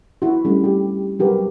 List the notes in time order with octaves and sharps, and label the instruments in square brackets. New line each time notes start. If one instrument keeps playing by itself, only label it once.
[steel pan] E4 F#4
G3 A3 C#4
G4
F#3 G3 F#4 G4 A#4 B4